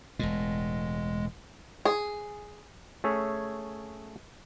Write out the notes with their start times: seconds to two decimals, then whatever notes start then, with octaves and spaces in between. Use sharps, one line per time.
0.19 E1 A2 G#3
1.85 G#4
3.04 A3 C#4 G#4 C#5 E5